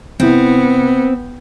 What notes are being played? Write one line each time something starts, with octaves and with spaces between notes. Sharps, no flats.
C3 B3 C4 E4